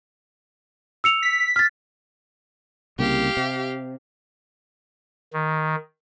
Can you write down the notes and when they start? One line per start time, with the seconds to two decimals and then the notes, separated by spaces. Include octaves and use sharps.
1.04 E6 C#7 F7
1.22 B6
1.56 F6 A6
2.99 C2 C#3 A#3 G4 F5
3.37 C3
5.33 D#3